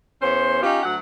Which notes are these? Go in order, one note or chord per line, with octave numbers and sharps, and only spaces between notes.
E2 B3 C#4 C5
C#4 D#4 F4 G4
D2 F#3 F#5